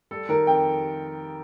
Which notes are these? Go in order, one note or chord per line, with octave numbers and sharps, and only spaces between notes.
G3 A4
D#3 A#4
F2 G5